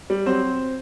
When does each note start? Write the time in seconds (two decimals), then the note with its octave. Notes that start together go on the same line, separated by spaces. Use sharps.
0.10 G3
0.26 F#3 C4 C5